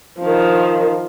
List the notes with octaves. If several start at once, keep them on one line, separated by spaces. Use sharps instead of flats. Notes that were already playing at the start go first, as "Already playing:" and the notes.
D#3 F3